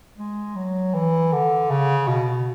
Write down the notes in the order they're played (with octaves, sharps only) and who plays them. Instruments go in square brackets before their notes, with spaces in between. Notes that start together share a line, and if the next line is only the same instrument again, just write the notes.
[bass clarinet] G#3
F#3
E3
D3
C#3
B2